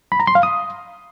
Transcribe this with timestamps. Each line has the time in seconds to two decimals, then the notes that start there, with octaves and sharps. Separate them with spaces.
0.12 B5
0.20 A#5
0.27 C6
0.35 F5
0.43 D#6